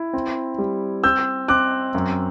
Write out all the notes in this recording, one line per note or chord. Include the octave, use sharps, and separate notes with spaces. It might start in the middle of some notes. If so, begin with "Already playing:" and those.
Already playing: E4
C4
G3
C4 E6 G6
C4 D6 F#6
F#2